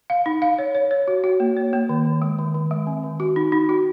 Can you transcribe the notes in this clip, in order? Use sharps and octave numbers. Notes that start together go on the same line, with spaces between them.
F5
D#4
F5
C#5
C#5
C#5
F#4
F#4
A#3
C#5
A#3
D#3
D#3
G#3
D#3
D#3
G#3
C4
D#3
F#4
D#4
D#4
F#4